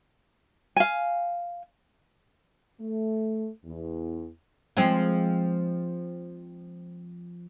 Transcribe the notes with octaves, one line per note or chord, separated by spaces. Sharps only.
F5 G#5
A3
E2
F3 G#3 C4